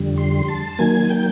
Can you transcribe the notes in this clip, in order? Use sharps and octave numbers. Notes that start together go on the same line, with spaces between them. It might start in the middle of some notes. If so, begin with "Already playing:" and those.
Already playing: F2 D3 G3
C6
A5
D#3 F#3 A#3 G#5
G5